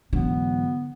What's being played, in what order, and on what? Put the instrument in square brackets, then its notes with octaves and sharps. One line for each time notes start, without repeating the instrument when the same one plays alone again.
[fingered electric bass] G#2 E3 F#3 [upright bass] D3 [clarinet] B3